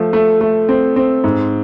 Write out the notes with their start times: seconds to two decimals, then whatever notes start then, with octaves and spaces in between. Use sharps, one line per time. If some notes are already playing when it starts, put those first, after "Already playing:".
Already playing: F3 A3
0.13 A3
0.41 A3
0.69 C4
0.96 C4
1.24 G#2